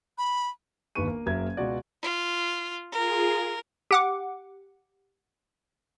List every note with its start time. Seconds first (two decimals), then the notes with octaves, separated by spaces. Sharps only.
0.18 B5
0.95 G1 D#2 D#3 B4 C#6 D#7
1.08 A#3
1.26 F#1 F#3 A#3 A#4 E5 G#6
1.57 C#2 B2 F#4 D5
2.02 F4
2.92 F4 G#4 A#4
3.91 G4 F#5 D6